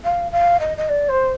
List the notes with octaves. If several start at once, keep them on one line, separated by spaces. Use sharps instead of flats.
F5
F5
D#5
D#5
D5
C5